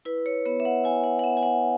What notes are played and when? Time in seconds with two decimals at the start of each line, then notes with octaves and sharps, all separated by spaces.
0.05 E4 B4
0.26 C#5
0.46 B3 C#5
0.60 E5
0.65 F#5
0.84 E4 G#5
1.04 F#5
1.19 F#5
1.24 B3 E5
1.37 G#5
1.43 F#5